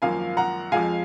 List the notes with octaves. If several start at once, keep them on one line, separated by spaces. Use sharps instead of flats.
G#1 F#2 F3 A#3 F5 G#5
F#5 A#5
F2 F3 G#3 F5 G#5